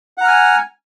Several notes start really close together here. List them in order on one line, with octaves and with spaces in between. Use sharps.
F#5 A#5 F6 G#5